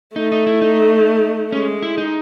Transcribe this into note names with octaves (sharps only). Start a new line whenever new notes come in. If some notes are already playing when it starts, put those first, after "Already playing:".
A3 D#4
D#4
E4
D#4
G#3 C#4
E4
D#4